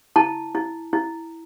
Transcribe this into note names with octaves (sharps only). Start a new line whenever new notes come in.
E4 A5
E4
E4